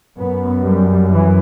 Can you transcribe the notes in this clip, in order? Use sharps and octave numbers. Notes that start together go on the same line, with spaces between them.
F#2 B3
G3
E3